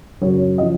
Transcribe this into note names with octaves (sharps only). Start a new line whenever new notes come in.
F#2 C#3 F#3 C#5
C#3 F3 D#5